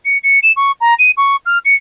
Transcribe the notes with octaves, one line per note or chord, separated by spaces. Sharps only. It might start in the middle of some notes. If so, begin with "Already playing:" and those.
C#7
C#7
E7
C#6
A#5
D#7
C#6
F6
C#7